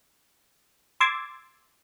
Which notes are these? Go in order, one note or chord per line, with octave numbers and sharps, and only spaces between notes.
C6 D6 E6 G#6 A6